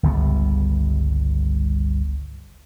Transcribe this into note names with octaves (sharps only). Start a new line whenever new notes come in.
G1 C#2 G3 B3